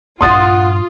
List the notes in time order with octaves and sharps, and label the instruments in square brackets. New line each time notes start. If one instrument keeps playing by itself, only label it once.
[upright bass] A#1 G2 [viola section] F4 [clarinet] F#5 [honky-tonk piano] C6 D#6 A6